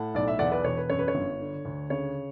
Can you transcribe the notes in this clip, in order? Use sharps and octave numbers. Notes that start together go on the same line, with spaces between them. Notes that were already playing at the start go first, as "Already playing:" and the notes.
Already playing: A2 F#5 A5
B1 D5
E5
E2 D5 F#5
E5
B4 D5
E1 C#5
B4
F#2 C#5
B4
C#5
G1
D3
D2
C#3 C#5